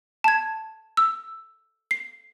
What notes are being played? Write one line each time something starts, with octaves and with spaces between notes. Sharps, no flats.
A5 G#6
E6
C7